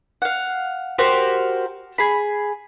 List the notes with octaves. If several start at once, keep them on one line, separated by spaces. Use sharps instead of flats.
F5 F#5
F#4 G4 A#4 C5
G#4 B5